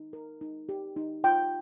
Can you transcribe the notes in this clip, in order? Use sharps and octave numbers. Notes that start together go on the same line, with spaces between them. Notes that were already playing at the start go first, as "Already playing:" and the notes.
Already playing: D#4
A#4
D#4
G4
D#4
F4 G5